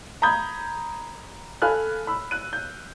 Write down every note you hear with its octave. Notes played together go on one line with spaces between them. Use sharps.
A#5 B5 D#6 G6 G#6
A4 F5 G#5 B5 F6 F#6
B5 E6
F#6 D#7
G6